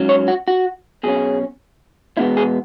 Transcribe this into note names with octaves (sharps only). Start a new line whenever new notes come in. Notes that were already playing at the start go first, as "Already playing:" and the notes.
Already playing: G#2 F#3 C#4
C#5
F#4
F#4
B2 F#3 C#4 G#4
E2 B2 G#3 B3 E4
G#4